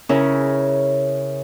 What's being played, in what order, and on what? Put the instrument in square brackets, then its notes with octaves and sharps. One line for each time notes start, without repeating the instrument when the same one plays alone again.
[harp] C#3 C#4 E4 A#4